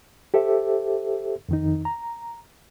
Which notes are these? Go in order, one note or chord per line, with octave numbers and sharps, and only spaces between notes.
G4 A4 C5 E5
F2 D#3 D#4
A#5